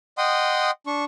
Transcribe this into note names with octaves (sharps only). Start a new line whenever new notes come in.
D#5 F#5 G5 C6 D#6
D4 C#6